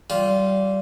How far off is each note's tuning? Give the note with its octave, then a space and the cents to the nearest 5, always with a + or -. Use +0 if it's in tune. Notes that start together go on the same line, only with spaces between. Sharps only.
G3 -25 F4 -5